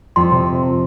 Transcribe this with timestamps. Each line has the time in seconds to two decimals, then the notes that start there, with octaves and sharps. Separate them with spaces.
0.16 F2 C6
0.31 C3